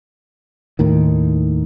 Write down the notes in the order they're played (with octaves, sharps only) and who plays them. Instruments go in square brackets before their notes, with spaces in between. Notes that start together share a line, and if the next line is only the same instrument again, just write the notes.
[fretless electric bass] D#2 A2 D#3